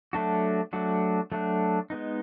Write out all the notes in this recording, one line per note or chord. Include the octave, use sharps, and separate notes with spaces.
F#3 A3 D4 F#4
F#3 A3 D4 F#4
F#3 A3 D4 F#4
G#3 B3 D#4